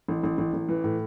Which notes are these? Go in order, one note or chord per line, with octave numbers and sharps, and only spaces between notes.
A1
A1
A1
A1
E3
A2